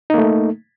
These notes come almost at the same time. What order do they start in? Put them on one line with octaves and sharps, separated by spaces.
D#4 A#3 A3